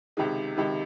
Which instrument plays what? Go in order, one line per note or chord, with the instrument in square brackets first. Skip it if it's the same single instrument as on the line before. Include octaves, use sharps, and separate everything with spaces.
[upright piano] C#2 C3 D#3 G#3
C#2 C3 D#3